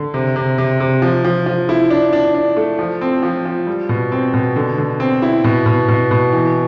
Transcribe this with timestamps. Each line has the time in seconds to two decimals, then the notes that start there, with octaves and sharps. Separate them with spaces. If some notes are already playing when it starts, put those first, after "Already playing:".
Already playing: D3
0.14 C3
0.36 C3
0.58 C3
0.80 C3
1.02 F3
1.25 F3
1.46 F3
1.69 E4
1.90 D4
2.13 D4
2.35 D4
2.57 A3
2.79 F3
3.01 C4
3.23 F3
3.45 F3
3.67 G3
3.89 B2
4.12 C4
4.34 B2
4.56 D3
4.78 D3
5.00 C4
5.22 E4
5.44 B2
5.66 B2
5.88 B2
6.11 B2
6.32 E3